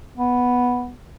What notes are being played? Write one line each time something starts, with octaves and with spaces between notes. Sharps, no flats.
B3